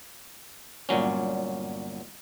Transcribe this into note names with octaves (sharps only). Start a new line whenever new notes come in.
G1 A#2 F#3 C#4